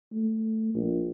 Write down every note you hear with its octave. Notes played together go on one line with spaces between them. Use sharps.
A3
A#1